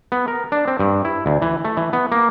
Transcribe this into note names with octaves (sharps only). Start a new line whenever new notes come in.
B3
A#4
D4
C4
G2
E4
D2
E3
A3
E3
B3
A#3